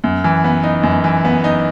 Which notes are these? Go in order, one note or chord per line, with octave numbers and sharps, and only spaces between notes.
F#2
E3
B3
D#4
F#2
E3
B3
D#4